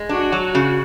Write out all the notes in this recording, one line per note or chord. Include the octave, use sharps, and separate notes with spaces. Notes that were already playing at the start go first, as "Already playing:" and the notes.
Already playing: G#3
D4 F#4
F#3
C#3